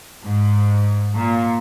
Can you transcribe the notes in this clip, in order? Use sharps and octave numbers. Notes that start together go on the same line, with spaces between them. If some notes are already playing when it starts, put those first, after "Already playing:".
G#2
A#2